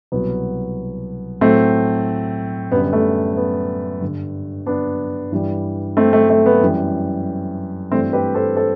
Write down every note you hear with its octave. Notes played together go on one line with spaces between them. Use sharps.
C2 B2 F#3 B3
A2 F#3 A3 C4
F#2 D3 G3 B3
A3
B3
G2 D3 G3
B3 D4
G2 E3 G3
A3 C4
A3
A3
B3
F#2 E3 G3
G2 E3 G3 A3 C4
G4 B4
A4 C5
A4 C5